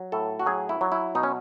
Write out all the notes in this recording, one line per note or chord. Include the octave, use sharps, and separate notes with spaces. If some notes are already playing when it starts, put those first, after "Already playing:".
Already playing: F#3
A2 A4
F#4
F#3 G#4
E4
F#3
E4
B2 D#4
C#4